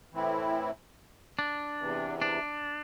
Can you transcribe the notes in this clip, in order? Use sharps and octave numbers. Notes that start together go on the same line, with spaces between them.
A2 E3 C4 E4
D4
E2 C3 E3
D4